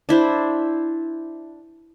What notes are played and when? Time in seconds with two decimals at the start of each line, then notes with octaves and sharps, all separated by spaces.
0.09 D4 E4 C5